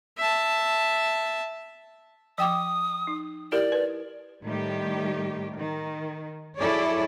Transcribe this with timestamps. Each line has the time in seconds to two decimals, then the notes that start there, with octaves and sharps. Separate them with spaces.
0.18 E5 A5
2.38 F3 G5 D6 D#6
3.07 D#4
3.52 E4 G4 A#4 D5
3.72 B4
4.43 A2 D#3 G3 G4
5.56 D#3
6.59 F#3 E4 G#4 A4 C#5 D5